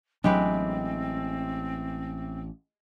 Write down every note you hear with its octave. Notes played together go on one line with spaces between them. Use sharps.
A1 F#3 G#3 C4 D4 G4 B4